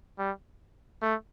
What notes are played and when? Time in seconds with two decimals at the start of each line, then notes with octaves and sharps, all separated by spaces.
0.19 G3
1.02 A3